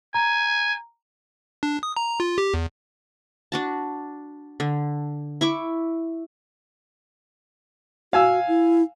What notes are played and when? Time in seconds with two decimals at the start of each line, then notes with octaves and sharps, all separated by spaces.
0.14 G#5 A#5
1.63 D4
1.83 D#6
1.97 A#5
2.20 F4
2.38 G4
2.54 E2
3.52 D4 F#4 A5
4.60 D3
5.41 E4 C#6 D6
8.13 F#4 F5 G#5 E6
8.48 E4